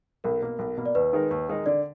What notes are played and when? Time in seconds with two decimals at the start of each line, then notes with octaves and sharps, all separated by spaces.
0.24 B1 A#4
0.42 B2 A#3
0.59 B1
0.77 B2 A#3
0.86 D5
0.95 D#2 B4
1.13 D#3 G#3 D#4 A#4
1.31 D#2
1.49 D#3 G#3 D#4 A#4
1.66 D3 D5